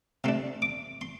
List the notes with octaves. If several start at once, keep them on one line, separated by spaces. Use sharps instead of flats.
C3 A3 D4 C6
D6
C6